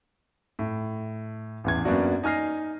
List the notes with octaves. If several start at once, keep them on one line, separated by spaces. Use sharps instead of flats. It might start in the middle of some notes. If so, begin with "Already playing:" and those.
A2
A1 E2 G#6
F#2 A#3 B3 D4 F#4
D#4 G#5 F6 A#6 C7